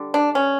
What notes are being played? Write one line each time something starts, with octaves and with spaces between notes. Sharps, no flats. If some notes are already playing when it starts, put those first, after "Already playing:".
Already playing: D3 G3
D4
C#4